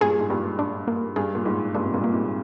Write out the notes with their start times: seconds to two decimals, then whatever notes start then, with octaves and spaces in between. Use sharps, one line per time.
0.01 G2 A#2 G#4
0.19 G#2
0.30 G2 A#2 G3
0.59 D4
0.88 A#3
1.16 G2 G#4
1.35 A#2
1.45 G#2 G3
1.74 G2 A#2 D4
1.86 C3
1.94 G2 A#2
2.04 A#3
2.14 G#2 C3